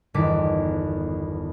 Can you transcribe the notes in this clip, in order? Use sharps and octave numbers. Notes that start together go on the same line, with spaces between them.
G1 E2 D#3 D6 B6